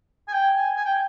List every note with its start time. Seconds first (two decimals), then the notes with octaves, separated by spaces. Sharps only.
0.28 G#5
0.33 G5
0.55 G#5
0.76 G#5
0.85 G5